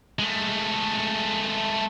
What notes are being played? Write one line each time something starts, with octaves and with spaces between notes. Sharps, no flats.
G#3 A3